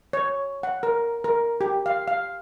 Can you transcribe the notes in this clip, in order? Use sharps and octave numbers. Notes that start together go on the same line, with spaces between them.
C#5
F#5
A#4
A#4
G4
F5
F5